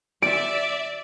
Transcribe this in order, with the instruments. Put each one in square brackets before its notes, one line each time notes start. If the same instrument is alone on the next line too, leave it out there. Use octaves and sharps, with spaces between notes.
[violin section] D5 E5 [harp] D7